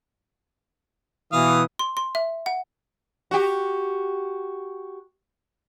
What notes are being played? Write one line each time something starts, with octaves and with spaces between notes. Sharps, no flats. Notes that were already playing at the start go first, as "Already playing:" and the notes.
B2 E3 F5 D#6
C6
C6
E5
F#5
F#4 G4